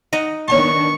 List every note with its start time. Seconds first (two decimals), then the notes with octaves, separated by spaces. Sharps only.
0.13 D#4 D#5 F#5
0.48 D#3 B3 D4 C#5 G5 A5 C#6